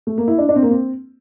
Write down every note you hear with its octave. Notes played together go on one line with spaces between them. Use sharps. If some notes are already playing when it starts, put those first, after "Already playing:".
A3
A#3
E4
D4
D4
C4
A#3
C4